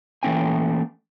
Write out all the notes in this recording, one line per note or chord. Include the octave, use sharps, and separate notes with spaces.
E3 A3 A#3 C#4 G5 G#5